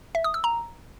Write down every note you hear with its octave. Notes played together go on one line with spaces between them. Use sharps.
E5
D#6
E6
A#5